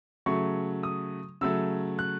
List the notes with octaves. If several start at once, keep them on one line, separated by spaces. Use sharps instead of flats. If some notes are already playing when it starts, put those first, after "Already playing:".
C#3 F#3 A3 C#6
D#6
C#3 F#3 A3 E6
F#6